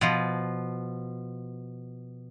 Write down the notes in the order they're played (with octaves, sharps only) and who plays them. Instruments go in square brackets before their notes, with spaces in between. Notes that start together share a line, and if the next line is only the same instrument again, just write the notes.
[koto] B2 F3